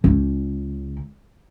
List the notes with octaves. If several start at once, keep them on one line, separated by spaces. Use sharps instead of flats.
C#2